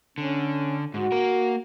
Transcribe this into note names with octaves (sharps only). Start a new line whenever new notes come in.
D3 C#4
G#2 F#4
A#3 A#4